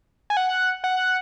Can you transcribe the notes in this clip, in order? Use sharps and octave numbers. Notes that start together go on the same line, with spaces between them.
G#5
F#5
F#5